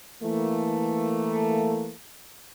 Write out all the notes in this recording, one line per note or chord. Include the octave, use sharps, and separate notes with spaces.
E3 A3 A#3